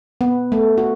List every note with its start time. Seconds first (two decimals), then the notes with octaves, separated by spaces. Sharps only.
0.21 B3
0.52 A3
0.78 F#4